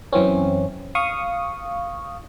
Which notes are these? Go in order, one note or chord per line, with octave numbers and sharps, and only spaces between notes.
F#2 E3 C4 C#4
F5 C#6 D#6